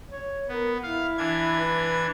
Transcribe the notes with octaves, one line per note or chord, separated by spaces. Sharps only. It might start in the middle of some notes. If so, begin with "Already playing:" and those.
C#5
B3 A#4
E4 F5
E3 D4 G#6
B4